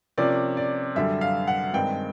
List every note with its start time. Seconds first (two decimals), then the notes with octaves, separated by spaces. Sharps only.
0.18 C3 F3 A#3 C#4 D5
0.57 D5
0.95 F#2 D3 G3 E5
1.21 F5
1.48 F#5
1.74 G2 D#3 G#3 C4 G5